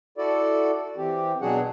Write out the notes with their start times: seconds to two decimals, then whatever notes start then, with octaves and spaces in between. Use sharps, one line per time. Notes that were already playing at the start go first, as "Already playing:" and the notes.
0.18 E4 F#4 A4 D5
0.97 E3 C4 G4
1.41 B2 F#3 D4 F#4 G#4 F#5